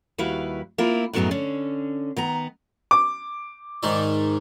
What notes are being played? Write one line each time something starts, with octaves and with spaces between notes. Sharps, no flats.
D#2 G3 E4 F#4 B4 F5
A#3 C4 E4 F4
F#2 A2 F#3 B3 D#4 G#4
D3 C#4
D#3 B3 A#5
D6
G#2 D#3 D5